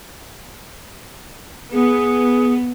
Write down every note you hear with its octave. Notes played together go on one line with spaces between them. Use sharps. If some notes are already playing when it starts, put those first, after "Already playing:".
B3 G#4